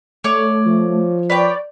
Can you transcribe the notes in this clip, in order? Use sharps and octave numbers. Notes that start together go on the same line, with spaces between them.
A3 C#5 D5
F3
B4 C#5 D5 G5